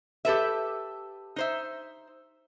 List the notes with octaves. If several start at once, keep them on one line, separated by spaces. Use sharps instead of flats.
G4 A4 B4 E5
D#4 C5 E5